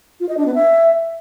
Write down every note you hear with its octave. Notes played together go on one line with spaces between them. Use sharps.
F4
D#5
D4
B3
E5